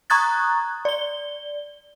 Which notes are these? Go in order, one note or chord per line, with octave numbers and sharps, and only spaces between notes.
A#5 C#6 D#6 F#6 G#6 A6
D5 G7